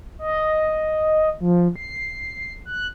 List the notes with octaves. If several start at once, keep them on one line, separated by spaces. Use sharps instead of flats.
D#5
F3
C7
F#6